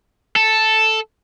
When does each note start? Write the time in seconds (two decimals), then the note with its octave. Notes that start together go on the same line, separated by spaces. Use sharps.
0.36 A4